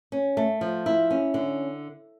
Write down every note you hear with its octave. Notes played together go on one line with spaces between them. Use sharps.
C#4
A3
F3
E4
C#4
D3